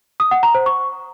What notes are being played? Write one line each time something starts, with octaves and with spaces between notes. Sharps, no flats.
D#6
F#5
A#5
C5
C#6